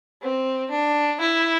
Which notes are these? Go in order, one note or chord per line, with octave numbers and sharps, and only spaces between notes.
C4
D4
E4